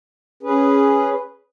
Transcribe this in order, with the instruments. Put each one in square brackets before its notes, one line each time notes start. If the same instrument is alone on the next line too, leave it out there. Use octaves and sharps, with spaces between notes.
[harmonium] C#4 G#4 B4